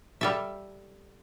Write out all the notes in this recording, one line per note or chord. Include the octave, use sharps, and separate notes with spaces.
G3 A4 E5